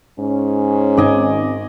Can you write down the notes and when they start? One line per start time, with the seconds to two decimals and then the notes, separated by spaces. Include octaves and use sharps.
0.19 G#2 C#4
0.97 G#1 D5 D#5 G#5